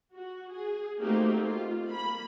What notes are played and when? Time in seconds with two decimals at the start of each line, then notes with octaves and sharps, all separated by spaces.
0.14 F#4
0.51 G#4
0.99 A3 A#3 C4 D#4 F#4 G4
1.40 F4
1.89 A#3 B5